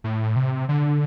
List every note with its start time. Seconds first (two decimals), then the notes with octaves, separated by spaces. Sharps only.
0.04 A2
0.36 C3
0.69 D3